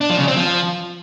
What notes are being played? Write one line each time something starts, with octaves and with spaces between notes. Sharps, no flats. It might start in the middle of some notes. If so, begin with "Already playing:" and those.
D4
F3
C#3
C4
F3